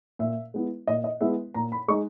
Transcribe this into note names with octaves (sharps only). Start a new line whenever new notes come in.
A#2 E5
G#3 B3 E4
A#2 D#5
D#5
G#3 B3 E4 E5
A#2 A#5
B5
G#3 D#4 C#6